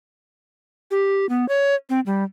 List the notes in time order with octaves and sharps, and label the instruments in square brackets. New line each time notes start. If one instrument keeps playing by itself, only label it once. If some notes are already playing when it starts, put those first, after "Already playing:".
[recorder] G4
B3
C#5
C4
G3